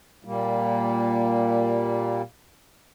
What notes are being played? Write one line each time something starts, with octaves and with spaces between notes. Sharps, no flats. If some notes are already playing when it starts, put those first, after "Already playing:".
A#2 G3 A#3